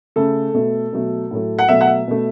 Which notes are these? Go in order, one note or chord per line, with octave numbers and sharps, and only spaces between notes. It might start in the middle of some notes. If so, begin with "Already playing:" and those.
C#3 A3 A4
B2 A3
B2 F#3 A3
A2 F#3 A3
F#5
B2 F#3 A3 E5
F#5
E5
B2 A3